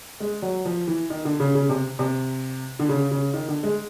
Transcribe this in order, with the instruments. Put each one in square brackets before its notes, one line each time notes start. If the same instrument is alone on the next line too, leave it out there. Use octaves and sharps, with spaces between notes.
[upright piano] G#3
F#3
F3
E3
D#3
D3
C#3
C#3
C3
C3
D3
C#3
C#3
D#3
D3
G#3